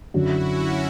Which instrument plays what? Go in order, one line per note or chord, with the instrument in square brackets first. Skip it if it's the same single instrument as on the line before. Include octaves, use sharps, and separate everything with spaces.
[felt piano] F#2 D3 F#3 [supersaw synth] E4 F#4
[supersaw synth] C#4